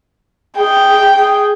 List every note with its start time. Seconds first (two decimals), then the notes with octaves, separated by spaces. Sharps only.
0.58 G#4 G5
1.14 G#4